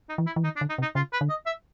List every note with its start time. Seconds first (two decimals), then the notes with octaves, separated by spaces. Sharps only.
0.10 D#4
0.18 E3
0.27 E4
0.36 E3
0.44 D#3 D#4
0.56 D4
0.61 D3
0.70 D#4
0.78 C3
0.82 D#4
0.95 C#3 F4
1.13 B4
1.21 D3
1.30 D#5
1.47 E5